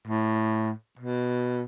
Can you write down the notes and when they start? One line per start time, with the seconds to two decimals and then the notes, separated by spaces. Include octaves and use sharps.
0.07 A2
0.99 B2